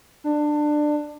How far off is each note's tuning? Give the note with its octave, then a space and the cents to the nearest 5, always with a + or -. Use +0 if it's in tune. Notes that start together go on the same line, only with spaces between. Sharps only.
D4 +20